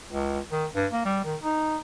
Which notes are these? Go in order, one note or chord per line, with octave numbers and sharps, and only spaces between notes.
C#2
D#3
G2
A#3
G3
D#3
D#4